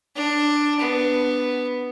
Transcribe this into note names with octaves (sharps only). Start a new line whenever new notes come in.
D4
B3